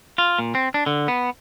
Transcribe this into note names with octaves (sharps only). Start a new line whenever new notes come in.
F4
A#2
C4
D4
D3
B3